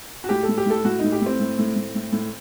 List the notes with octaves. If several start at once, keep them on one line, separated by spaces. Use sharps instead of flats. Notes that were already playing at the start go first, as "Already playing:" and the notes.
F#4
A2 G4
A4
A2
G4
A2 A4
A2 F#4
A2 D#4
G4
A2 C4
A2
A2
A2
A2
A2